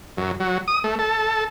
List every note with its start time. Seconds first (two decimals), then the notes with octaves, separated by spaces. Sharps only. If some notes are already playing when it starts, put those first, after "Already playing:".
0.17 F#2
0.40 F#3
0.68 D#6
0.84 A3
0.99 A4